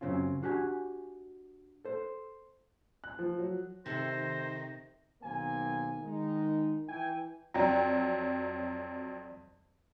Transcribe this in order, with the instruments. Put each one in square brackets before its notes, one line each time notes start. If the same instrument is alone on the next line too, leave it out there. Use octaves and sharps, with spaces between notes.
[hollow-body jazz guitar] F#2 C#3 C4 C#4 F4
D4 F#4 G4 G#5
A4 C5
[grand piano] F#6
F3
F#3
[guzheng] C3 A4 C6 [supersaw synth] D#3 [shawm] C5 [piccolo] A#6
[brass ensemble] B1 D#3 A#3 C4 G#5
D#3 G#3 D#4
E3 G5 G#5
[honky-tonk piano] F2 F#3 [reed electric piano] D5 G5 A#5